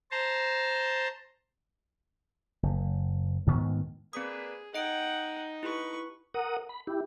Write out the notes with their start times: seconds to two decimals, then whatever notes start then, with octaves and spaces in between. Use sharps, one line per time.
0.11 C5 A5 A#5 C6
2.63 F#1
3.47 D2 G#2 D#3 B3
4.13 A#3 C4 D4 G#4 B4 D#6
4.75 D#4 D#5 F#5 G5 D7
5.63 E4 G4 B4 C#6
6.34 A#4 F#5 D#6
6.69 B5
6.87 E4 G4